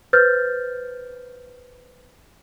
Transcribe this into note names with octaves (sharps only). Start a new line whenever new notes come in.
B4 C5 F6 G6 A6